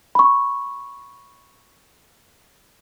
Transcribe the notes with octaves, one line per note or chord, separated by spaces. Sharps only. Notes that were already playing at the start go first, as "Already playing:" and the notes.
B5 C#6